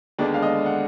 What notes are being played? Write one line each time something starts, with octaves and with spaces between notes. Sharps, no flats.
D#2 D3 G#3 B3 D4 D5
F5
D#5
F#5